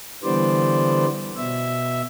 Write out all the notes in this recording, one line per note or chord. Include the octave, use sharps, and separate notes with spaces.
D3 E3 G3 B3 C5 D5
B2 E5